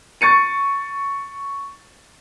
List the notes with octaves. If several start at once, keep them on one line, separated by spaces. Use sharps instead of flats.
C#6 A6 C#7 D#7